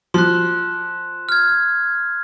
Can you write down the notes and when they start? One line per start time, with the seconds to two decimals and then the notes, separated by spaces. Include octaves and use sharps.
0.14 F3 C6 F#6
1.29 F6 G#6